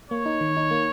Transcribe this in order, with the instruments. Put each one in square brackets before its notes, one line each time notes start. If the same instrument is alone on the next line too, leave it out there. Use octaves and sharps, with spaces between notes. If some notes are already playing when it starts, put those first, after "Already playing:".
[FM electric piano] A#3 [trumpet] C#5
[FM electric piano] D#4
D#3
D#4
A#3